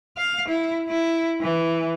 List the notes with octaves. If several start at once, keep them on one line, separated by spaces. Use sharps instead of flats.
F5
E4
E4
E3